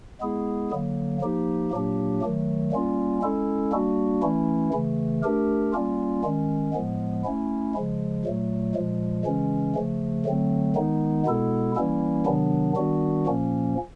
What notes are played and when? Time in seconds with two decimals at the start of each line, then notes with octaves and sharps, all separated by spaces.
0.21 G#3 B3 E4 G#4
0.71 D3 F#3 A#3
1.21 F3 A#3 D#4 G4
1.71 A#2 F#3 A#3 D4 G4
2.21 D#3 F#3 A3
2.72 G3 A#3 C#4 F4
3.22 G#3 C#4 E4 A4
3.72 G3 A#3 D4 F#4
4.22 E3 A3 C#4 E4
4.73 C#3 E3 A3
5.23 A3 D4 G4 A#4
5.73 G3 A#3 C#4 F4
6.24 D#3 G#3 C#4
6.73 A2 F3 G#3 B3
7.24 A3 C#4 E4
7.74 C#3 F3 G#3
8.25 A#2 F#3 A3
8.74 A#2 F3 G#3
9.25 C#3 E3 G#3 C#4
9.75 C#3 F3 A3
10.25 D3 F#3 A3 C4
10.75 D#3 G#3 B3 D#4
11.26 B2 G#3 B3 E4 A4
11.75 E3 G3 A#3 C#4 E4
12.26 C3 D#3 F#3 B3 D4
12.76 D#3 G3 B3 D4 F#4
13.26 A#2 F3 A#3 C#4